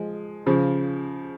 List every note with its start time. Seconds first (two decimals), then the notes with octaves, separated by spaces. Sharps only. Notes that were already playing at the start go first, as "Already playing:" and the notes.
Already playing: F3 G#3
0.46 C#3 F3